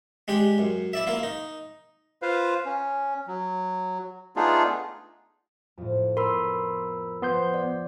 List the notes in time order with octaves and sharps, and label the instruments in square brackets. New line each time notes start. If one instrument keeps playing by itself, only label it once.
[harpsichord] G#3 D4 G4
F#2
E4 D5 E5
A#3 E4 F4
D#4
[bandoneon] F4 B4 C5 F5
C#4
F#3
A3 B3 D4 D#4 F4 G#4
[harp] F2 A2
[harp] B3 B4 [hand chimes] A#4 B5 E6 [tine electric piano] C6
[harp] F3 [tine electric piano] B3 C6 G6
[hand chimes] D5